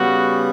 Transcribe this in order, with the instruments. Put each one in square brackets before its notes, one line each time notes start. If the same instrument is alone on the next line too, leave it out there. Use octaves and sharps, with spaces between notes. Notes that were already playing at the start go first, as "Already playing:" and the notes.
Already playing: [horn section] C#3 G3 B3 [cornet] F#4